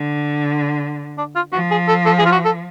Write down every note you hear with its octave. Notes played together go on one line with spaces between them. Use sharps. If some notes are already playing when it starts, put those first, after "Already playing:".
Already playing: D3
D4
F4
F3 F#4
G#4
A4
A4
G#4
F4
F#4
A4